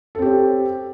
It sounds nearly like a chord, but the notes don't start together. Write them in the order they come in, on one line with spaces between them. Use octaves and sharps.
A4 C4 G4 C#5